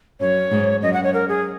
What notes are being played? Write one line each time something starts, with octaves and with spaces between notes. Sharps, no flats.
F#2 C#5
G#2
F#2 D#5
F#5
C#5
A#4
G#4